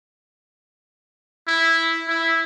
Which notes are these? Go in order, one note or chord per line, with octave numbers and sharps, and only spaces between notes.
E4
E4